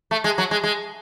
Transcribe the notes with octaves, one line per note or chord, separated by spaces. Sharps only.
A3
G#3
F#3
G#3
G#3